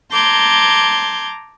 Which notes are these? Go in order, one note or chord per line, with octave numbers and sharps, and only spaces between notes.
A5 A#5 C6 D6 G6 G#6